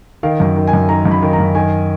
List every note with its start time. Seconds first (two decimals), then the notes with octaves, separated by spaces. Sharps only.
0.23 D#3 F5
0.40 F#2
0.56 D#3
0.67 G#5
0.73 F#2
0.89 D#3 A#5
1.05 F#2
1.11 B5
1.22 D#3
1.33 A#5
1.39 F#2
1.55 D#3 G#5